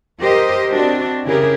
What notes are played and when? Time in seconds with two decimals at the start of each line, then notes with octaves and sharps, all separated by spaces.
0.21 G4 A#4 C5 D#5
0.70 C4 D4 F#4
1.25 C#3 E4 G4 G#4 A#4